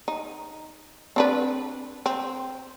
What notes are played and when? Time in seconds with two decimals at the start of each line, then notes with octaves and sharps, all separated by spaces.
0.08 D#4
1.16 C4 D4 B4
2.06 C4